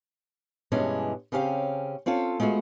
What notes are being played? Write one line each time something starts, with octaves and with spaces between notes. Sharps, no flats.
G2 B2 E3 G#3 C#4 D4
C#3 C4 C#4 G4 F5
C4 C#4 F4 A4
G#3 A3 B3 F4 F#4